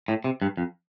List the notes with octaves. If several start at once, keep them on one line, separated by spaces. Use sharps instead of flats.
A2
C3
G2
F2